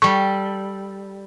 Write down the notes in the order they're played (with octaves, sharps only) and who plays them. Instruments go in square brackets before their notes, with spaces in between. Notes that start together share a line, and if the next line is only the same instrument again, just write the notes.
[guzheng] G3 A4 [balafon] C#6